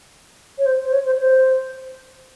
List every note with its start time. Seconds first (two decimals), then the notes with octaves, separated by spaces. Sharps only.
0.58 C#5
0.65 C5
0.85 C5
0.92 C#5
1.06 C5
1.19 C5